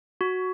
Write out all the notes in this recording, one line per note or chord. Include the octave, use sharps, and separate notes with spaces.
F#4